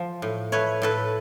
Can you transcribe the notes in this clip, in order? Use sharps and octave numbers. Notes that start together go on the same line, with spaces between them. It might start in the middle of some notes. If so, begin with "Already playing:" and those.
Already playing: F3
A2
A3 B4 C#5
A2 A4 B4